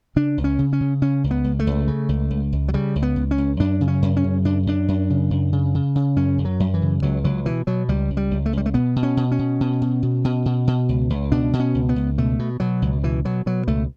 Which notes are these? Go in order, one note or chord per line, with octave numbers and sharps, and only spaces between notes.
C#3 D4
C#2
C#4
C#3
C#4
C#3
C#3 C#4
C#2
B3
C#2
A3
C#2
C#3
C#2
C#2
C#2
F#3
C#3 G3
C#2
B3
C#2
C#4
C#2
F#2 D4
C#3
C#4
F#2
C#4
C#3
F#2 D4
F#2 D4
F#2
C#3
F#2
C#3
C#3
C#3
F#2 C#4
F#2
F#3
F#2
E3
C#3
C#2 F#3
C#2 F#3
B2 E3
B2 F#3
C#2 G3
C#2
G3
C#2
A3
C#2 G3
A3
B2 B3
B2
C#4
B2
C#4
B2
B2
B2
B2
B2
B2
B2
C#2
C#2
B2 D4
B2
C#4
C#2
B3
C#2
B2 A3
B2
B2 F#3
C#2
B2 E3
B2 F#3
B2 F#3
C#2 A3